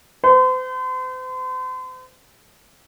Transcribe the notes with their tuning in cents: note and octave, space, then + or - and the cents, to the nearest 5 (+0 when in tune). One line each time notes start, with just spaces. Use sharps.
C5 -40